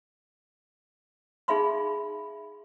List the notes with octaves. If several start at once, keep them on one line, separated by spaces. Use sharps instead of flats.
D#4 G#4 E5 F5 B5 C6